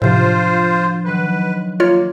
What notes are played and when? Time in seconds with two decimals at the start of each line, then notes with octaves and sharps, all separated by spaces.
0.02 A2 C3 F3 D4 F4 C5
1.05 D#3 F#3 B4 C6
1.80 A#3 F4 C#5